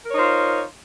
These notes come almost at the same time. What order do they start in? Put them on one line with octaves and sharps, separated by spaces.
A#4 C#5 D#4 C5 F4